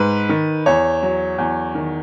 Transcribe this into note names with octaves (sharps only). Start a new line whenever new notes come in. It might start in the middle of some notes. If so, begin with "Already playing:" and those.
Already playing: G#2 B4
D#3
E2 C#5
F#3
E2
D#3